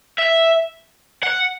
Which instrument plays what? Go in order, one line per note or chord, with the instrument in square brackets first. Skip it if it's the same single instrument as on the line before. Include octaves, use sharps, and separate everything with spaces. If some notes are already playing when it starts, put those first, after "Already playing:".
[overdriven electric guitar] E5
F#5